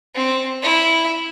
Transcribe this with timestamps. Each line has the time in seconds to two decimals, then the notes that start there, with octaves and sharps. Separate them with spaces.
0.15 C4
0.62 E4